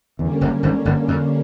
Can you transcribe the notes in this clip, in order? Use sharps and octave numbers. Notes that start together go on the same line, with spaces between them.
E2 D3 G3 A#3 C#4
F#1 F#2
G#1 G#2
G1 G2
F2